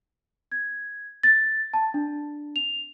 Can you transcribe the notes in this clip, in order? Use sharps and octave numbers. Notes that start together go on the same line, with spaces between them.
G#6
A6
A5
D4
F7